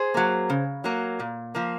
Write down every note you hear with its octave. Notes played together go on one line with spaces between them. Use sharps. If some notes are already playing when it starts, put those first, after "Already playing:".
Already playing: G#4 C5
F#3 A#3
C#3
F#3 A#3
A#2
F3 A#3